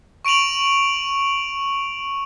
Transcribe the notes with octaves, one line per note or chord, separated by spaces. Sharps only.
C#6 D7 D#7 F7 F#7